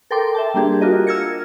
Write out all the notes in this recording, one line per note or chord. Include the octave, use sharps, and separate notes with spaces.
A4 A#4 G5 C6 D6
E5 G5 A5
G3 A#3 D4 G4 G#4
F4 F#4 A#4 D#5
E6 F6 G#6 A#6 C#7